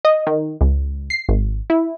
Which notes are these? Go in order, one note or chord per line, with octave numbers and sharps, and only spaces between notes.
D#5
D#3
C#2
C7
G#1
E4